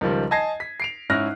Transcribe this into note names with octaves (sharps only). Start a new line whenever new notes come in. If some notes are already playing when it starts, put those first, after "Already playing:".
C#2 D#3 F3 G3
D#5 G#5 A5 G#6 A#6 C7
B6
C7 D7 F7
G#2 C#4 E4 F6 F#6 A#6